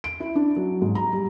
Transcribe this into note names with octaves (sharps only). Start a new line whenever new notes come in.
D7
E4
D4
F#3
G#2
A#5
G3